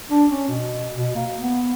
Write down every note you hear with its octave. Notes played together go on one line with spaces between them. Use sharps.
D4
C#4
B2
B2
A#3
B3